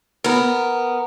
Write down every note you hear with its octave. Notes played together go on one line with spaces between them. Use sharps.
B3 A#4